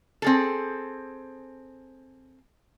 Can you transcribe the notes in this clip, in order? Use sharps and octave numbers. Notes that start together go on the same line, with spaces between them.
C4 G#4 A4